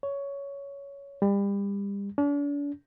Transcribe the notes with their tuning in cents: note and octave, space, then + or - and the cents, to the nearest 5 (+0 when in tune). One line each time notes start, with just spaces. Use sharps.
C#5 +10
G3 +30
D4 -40